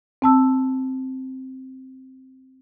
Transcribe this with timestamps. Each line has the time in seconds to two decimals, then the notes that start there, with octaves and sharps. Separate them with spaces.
0.22 C4 A5 E6